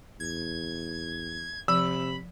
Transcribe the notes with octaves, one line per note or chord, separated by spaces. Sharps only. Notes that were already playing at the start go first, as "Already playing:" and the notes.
E2 G#6
C3 F3 B5 E6